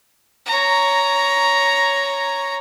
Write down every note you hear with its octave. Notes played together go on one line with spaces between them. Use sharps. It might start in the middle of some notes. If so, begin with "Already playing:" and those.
C#5 A#5